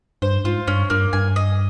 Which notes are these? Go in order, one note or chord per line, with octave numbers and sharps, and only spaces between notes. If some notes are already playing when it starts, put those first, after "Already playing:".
G2 C5
G#2 F4
G2 C#4
G2 A#3
G2 G#5
D#5